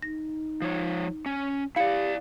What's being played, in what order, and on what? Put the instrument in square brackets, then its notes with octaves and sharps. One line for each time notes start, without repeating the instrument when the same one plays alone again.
[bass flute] D#4 [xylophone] A#6
[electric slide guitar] F3 C#5
C#4
[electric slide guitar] E4 D5 [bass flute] G4 [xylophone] F5 C#7